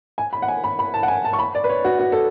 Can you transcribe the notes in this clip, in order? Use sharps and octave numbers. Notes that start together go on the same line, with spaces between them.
G#5
B5
F#5
G#5
B5
B5
A5
F#5
G#5
A5
C#6
B5
D5
B4
C#5
F#4
F#4
A4